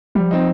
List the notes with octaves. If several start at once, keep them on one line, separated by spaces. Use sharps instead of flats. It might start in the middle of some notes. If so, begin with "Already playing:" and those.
F3 G3
C4 D#4